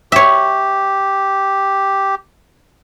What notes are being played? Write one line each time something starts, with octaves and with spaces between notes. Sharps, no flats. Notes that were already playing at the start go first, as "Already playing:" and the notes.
G4 C#5 E5